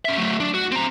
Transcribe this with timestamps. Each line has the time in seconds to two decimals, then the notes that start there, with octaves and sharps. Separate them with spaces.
0.05 C#4 E5
0.18 F#3 A3
0.40 D4
0.54 F#4
0.72 C4 A#5